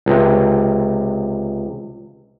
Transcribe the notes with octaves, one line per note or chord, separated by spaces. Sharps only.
C#2 C3